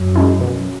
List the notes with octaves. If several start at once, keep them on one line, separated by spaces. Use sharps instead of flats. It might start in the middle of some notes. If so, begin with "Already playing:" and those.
Already playing: F#2
G#3 C#4 E4
B2